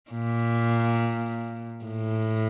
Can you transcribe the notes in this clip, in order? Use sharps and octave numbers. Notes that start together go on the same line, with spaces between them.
A#2
A2